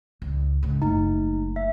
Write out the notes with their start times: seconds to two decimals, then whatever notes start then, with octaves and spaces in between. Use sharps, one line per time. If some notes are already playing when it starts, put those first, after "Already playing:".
0.22 C#2
0.63 G#2 C#3
0.82 F#1 A3 D#4
1.56 E5